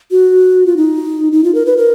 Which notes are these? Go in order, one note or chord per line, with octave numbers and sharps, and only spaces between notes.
F#4
F4
D#4
D#4
F4
A#4
B4
A#4